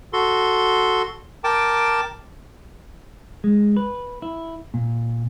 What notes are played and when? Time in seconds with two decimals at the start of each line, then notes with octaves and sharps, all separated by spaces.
0.13 F#4 A4 C6
1.44 A#4 G5 A5 D6
3.44 G#3
3.77 B4
4.22 E4
4.74 A#2